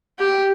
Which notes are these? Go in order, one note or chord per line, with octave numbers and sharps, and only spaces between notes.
G4